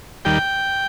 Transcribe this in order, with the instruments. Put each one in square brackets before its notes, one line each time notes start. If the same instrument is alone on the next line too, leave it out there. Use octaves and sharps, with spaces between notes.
[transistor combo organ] D#2 D#3 G3 G5